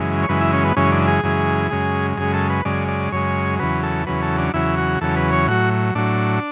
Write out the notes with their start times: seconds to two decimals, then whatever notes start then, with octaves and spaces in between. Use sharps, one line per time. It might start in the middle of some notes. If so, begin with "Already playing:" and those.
Already playing: F#2 C#3 E3 G#3
0.23 C#5
0.29 F#2 C#3 E3 G#3 B4
0.41 E4
0.53 C#4
0.64 B3
0.76 F#2 C#3 E3 G#3 C#4
0.92 D4
1.08 G#4
1.23 F#2 C#3 E3 G#3
1.71 F#2 C#3 G#3
2.17 F#2 C#3 G#3 G#4
2.33 A4
2.50 B4
2.65 F#2 C#3 G#3 D5
2.88 D5
3.12 F#2 C#3 G#3 C#5
3.59 E2 C#3 F#3 B4
3.83 A4
4.06 E2 C#3 F#3 B4
4.22 A4
4.38 D4
4.54 E2 C#3 F#3 E4
4.78 F#4
5.01 E2 C#3 F#3 A4
5.17 B4
5.32 C#5
5.48 A2 F#3 F#4
5.95 A2 F#3 D4